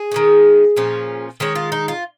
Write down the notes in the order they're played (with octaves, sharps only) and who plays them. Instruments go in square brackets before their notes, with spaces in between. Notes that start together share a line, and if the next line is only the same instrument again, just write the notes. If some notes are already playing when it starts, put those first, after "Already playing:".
Already playing: [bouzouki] G#4
D#3 G#3 C#4
A#2 F3 C#4
D#3 G#3 C#4
F4
D#4
F4